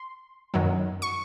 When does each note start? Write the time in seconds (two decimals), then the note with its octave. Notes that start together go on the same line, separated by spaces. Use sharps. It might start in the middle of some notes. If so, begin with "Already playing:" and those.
Already playing: C6
0.54 F#2 D#3 F#3
1.02 C#6